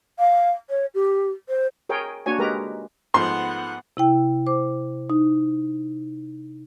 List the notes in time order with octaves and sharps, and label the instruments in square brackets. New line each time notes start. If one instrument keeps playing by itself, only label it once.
[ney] F5
C#5
G4
C5
[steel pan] G#4 A#4 C#5 G5
A#3 D4 F#4 C#5 G#5
G#3 G4 A#4 B4 A#5
[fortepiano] G#2 F3 A3 [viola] B3 F#5 [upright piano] C6
[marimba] C3 E4 G5
C5 D6
D#4